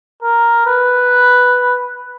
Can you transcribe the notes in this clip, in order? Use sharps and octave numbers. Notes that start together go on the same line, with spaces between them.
A#4
B4